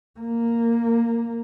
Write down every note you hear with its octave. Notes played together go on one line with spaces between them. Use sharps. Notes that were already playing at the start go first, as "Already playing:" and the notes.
A#3